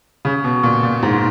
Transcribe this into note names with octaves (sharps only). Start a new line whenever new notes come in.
C#3
B2
A#2
A#2
G#2